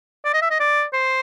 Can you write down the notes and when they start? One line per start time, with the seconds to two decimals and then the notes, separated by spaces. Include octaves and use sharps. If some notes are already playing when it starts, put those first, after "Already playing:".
0.25 D5
0.33 D#5
0.42 E5
0.50 D#5
0.60 D5
0.93 C5